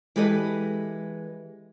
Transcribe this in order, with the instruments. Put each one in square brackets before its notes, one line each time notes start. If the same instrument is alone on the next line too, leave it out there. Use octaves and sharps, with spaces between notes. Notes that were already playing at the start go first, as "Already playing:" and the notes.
[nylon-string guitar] E3 G#3 G4 A4 B4 D#5